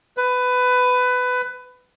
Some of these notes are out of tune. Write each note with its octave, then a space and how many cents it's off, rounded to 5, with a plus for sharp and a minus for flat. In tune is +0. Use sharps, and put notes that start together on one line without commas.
B4 +15